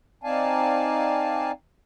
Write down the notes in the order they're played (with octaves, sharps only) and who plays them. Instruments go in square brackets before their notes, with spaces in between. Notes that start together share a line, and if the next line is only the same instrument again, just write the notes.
[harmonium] C4 D#4 D5 F5 G#5 A5